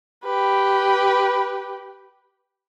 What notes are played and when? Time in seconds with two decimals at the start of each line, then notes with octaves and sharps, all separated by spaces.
0.24 G4 B4